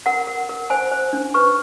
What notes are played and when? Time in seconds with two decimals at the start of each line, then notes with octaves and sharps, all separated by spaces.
0.06 A#4 F#5
0.27 A#4
0.49 A#4
0.70 C5 G#5
0.92 C5
1.13 D4
1.34 B4 C#6